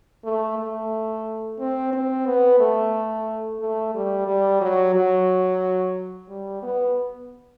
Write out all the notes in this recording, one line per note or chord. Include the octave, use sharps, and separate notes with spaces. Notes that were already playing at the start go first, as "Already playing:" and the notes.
A3
A3
C4
C4
B3
A3
A3
G3
G3
F#3
F#3
G3
B3